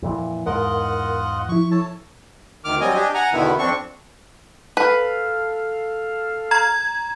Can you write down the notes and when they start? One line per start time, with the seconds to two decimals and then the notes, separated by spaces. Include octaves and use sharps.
0.02 F2 A#2 E3
0.46 E2 G#2 F4 A#4 D#5 F#5
1.49 F3 E4 C#6
1.71 A4 C#5 A5
2.65 D2 D#3 D6 F6
2.81 F#3 G3 C4 D#5 G#5
2.95 D4 G4 D#5 G#5
3.14 F#5 G#5 A#5
3.33 E2 B2 D3 D#3 B3 E4
3.59 F2 C4 D4 C#6
4.77 A4 B4 F5
6.51 A#5 G#6